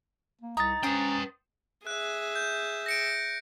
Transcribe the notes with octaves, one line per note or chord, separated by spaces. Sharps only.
A#3
C2 D#4 A#5 A6
C#4 B4 C5 G5 D#6
G#4 E5 F#6
G6
A#6 C#7 D7